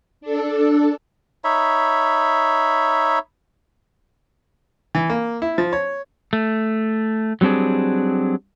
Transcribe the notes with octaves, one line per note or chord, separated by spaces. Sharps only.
D4 A4
D#4 C#5 E5 B5
E3
A#3
E4
F3
C#5
A3
F#3 G3 C4 D4 G#4